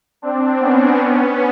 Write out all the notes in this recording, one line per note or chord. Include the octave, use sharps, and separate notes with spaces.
C4 D4
B3 C#4
B3 C#4